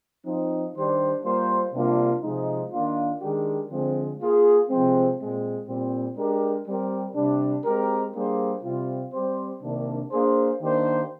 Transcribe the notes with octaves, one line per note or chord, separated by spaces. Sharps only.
F3 C4 D#4
D#3 G3 D4 G4 C5
G3 A#3 F4 C5
C3 G3 A#3 D4 F4
C3 F3 G#3 D#4
D#3 A#3 D4 F4
D#3 G#3 D4 G4 A#4
D3 F3 G#3 C4
A#3 F4 G#4
C3 F3 G#3 C4
A#2 G#3 C4
A#2 G3 C4
G#3 D4 G4 A#4
G3 C4 G4 A#4
C3 G3 D4
G#3 C4 G4 A#4
G3 A#3 D4 G#4 C5
C3 G3 C4 F4
G3 C4 G4 C5
C3 D#3 A#3 D4
A#3 D4 G#4 C5
D#3 A#3 D4 G4 C5